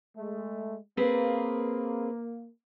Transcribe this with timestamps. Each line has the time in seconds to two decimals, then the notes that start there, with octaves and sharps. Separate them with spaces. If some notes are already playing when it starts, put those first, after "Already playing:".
0.16 G#3 A3
0.97 A#3 C4 G#4 B4